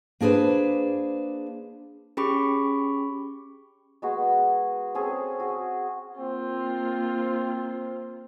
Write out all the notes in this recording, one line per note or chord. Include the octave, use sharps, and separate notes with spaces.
A#3 D4 G#4 B4 C5
C#4 G4 G#4 B5 C#6 D6
G#3 B3 F#4 G#4
C4 C#4 G#4 A4
F#4 G#4
A#3 C4 F4